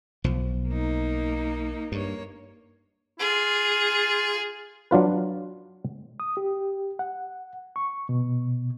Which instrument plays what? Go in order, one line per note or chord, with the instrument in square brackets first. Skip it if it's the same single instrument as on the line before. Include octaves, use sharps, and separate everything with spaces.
[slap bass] B1 F3
[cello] A#3 D#4
[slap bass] G2 [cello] A#3 C#5
[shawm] F4 [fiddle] G#4
[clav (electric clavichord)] F#3 D4 F4 B4
[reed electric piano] D#6
G4
F#5
C#6
B2